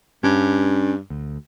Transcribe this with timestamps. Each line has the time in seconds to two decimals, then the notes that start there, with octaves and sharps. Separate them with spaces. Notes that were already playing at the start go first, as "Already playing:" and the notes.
0.24 G2 C#4
1.10 D2